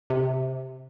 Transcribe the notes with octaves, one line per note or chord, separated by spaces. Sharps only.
C3